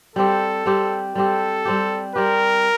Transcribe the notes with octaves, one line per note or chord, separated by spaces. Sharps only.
G3 C4 G4 A4
G3 C4 G4
G3 C4 G4 A4
G3 C4 G4
G3 C4 G4 A#4